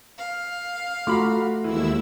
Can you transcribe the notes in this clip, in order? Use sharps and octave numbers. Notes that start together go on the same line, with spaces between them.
F5
A3 F4 F#4 A#5 B5 D6
D#2 E3 G#3 E4 E6